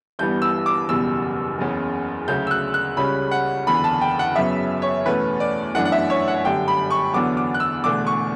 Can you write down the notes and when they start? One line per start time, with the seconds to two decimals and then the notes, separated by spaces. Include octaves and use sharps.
0.19 G1 G2 E3 G3 B3 G6
0.42 E6
0.66 D6
0.89 F#1 E2 B2 G3 E6
1.58 F#1 E2 C#3
2.28 D2 C#3 F#3 G6
2.47 E6
2.51 F#6
2.74 F#6
2.97 C#2 C#3 G3 C#4 B5
3.31 F#5
3.67 F#1 E2 D3 B5
3.84 A5
4.01 G5
4.19 F#5
4.36 F#2 C#3 F#3 B3 E5
4.82 C#5
5.06 E2 B2 A3 C#4 B4
5.40 D5
5.75 G1 F#2 E3 A3 D4 F#5
5.85 F#5
5.92 E5
6.10 C#5
6.28 F#5
6.44 G1 F#2 D3 G3 G5
6.68 B5
6.90 C#6
7.13 E2 D3 F#3 B3 D6
7.37 D6
7.54 F#6
7.60 E6
7.84 E1 E2 D3 A3 D6
8.07 C#6